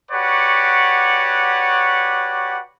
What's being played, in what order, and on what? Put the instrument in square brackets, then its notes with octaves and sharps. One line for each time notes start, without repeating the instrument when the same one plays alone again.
[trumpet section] F#4 G4 B4 C#5 D5 F#5